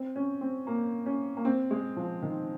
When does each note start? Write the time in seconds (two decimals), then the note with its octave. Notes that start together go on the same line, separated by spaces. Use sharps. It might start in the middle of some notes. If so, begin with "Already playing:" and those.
Already playing: C4
0.16 C#4
0.41 C4
0.67 A#3
1.06 C#4
1.37 A#3
1.45 C4
1.71 G#3
1.97 F3
2.22 D#3